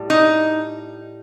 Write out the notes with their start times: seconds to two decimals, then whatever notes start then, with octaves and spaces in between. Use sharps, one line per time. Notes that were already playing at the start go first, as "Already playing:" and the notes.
Already playing: A2 G3
0.10 D#4